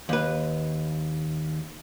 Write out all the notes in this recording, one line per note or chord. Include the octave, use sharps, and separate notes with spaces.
D#2 B4